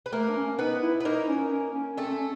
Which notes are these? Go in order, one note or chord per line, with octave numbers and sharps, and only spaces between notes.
B4
A3 A#3 A#4
D4
C#4
B3 D#4 B4
E4
B4
A#3 D#4 A#4
C#4
C#4
C#4
A3 C4 A4
C#4